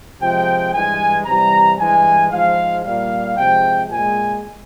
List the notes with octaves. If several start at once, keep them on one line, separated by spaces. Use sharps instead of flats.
C3 F3 G#3 G5
G2 E3 G#3 G#5
C3 E3 G3 A#5
G2 E3 G#3 G#5
G#2 F3 G#3 F5
A#2 G3 F5
C3 F3 G#3 G5
A#2 G#3 G#5